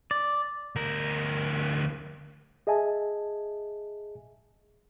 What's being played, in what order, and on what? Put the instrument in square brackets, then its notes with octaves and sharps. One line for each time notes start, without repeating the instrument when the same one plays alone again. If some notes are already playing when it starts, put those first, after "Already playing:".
[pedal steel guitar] D5
[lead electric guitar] D2 A#4
[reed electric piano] G#4 D#5 E5 G#5 A5